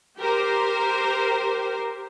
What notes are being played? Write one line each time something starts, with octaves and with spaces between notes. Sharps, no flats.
G4 A#4 C5